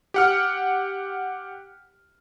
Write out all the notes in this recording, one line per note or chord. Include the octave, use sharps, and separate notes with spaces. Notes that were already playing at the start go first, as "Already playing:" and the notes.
G4 F#5 F6